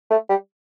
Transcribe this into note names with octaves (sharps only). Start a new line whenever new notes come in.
A3
G3